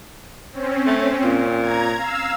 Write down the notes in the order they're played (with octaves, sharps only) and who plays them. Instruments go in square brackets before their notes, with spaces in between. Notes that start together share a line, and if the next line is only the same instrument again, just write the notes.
[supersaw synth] C4 C#4
[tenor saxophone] A3
A#2
[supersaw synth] A#5 G#6
F5 E6